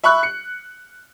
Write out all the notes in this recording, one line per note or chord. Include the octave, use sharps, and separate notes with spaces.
E5 B5 C#6 F#6
C#7